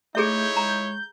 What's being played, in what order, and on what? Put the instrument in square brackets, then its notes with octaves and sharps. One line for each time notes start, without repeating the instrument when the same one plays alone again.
[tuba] A3 [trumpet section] D#4 E4 C#5 [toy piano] G#4 A4 E5 [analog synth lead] G6
[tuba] G#3 [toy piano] A#5